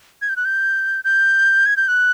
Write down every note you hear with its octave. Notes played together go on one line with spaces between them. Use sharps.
G#6
G6
F#6
G6
G6
G#6
G6
F#6